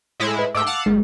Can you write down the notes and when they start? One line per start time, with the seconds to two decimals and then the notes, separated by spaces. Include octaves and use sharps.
0.20 A2 G#3 E4
0.39 B4
0.55 G#2 A3 G5 D6 E6
0.67 F5 F#5 A5
0.86 G1 G#3